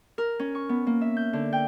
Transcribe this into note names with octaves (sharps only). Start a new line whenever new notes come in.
A#4
C#4
C#6
B3
A#3
E5
G6
D3
G5